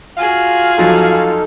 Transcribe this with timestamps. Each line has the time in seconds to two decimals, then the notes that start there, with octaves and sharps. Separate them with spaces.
0.18 F4 F#4 G#4 F5
0.78 E2 F3 F#3 D#4 A4